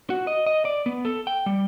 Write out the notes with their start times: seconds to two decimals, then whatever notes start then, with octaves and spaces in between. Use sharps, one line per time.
0.10 F#4
0.27 D#5
0.46 D#5
0.65 D5
0.86 B3
1.05 A4
1.27 G5
1.46 G3